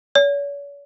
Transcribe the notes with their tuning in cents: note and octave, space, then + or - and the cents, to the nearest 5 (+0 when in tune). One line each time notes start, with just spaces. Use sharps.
C#5 +45